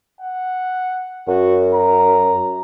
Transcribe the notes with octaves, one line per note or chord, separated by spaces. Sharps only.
F#5
F#2 F#4
A#5